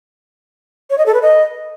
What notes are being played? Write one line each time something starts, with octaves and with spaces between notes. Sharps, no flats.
C#5
D#5
A4
B4
D#5